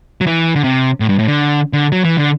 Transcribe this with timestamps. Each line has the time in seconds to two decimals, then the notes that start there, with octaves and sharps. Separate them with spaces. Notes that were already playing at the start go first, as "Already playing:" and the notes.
0.21 F#3
0.27 E3
0.55 D3
0.64 C3
1.00 A2
1.09 G2
1.19 A2
1.27 D3
1.73 D3
1.92 F#3
2.04 E3
2.17 D3